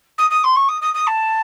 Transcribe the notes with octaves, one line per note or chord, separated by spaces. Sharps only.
D#6
D#6
C6
C#6
D#6
D#6
D#6
A5